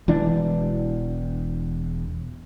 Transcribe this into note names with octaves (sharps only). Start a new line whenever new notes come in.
E1 E3 D4